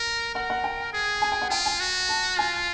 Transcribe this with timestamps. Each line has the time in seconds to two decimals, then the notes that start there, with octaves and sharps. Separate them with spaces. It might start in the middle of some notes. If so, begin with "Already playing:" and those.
Already playing: A#4
0.35 A#4 F#5
0.50 F#5
0.64 G5
0.93 G#4
1.22 G#5
1.32 G5
1.42 F#5
1.50 F4 G5
1.66 G#5
1.80 F#4
2.09 A5
2.37 F4 G#5